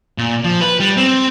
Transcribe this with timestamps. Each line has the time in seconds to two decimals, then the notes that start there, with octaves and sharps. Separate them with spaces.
0.18 A#2
0.44 F3
0.61 B4
0.80 G3
0.97 C4